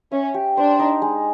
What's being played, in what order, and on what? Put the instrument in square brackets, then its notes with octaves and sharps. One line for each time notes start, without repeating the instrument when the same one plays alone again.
[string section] C#4 [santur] E5
[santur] G4
[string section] D4 [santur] C5
[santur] D#4
G#3